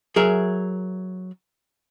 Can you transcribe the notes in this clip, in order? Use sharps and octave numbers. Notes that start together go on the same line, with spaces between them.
F#3 G#4 A#4 E5